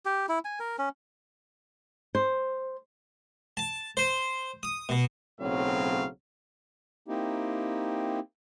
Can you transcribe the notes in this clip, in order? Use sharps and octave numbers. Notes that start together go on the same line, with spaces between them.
G4
E4
G#5
A#4
C#4
C5
A5
C5
D#6
B2
B1 A2 C#3 F#3 C4 F5
A#3 C4 D#4 E4 G4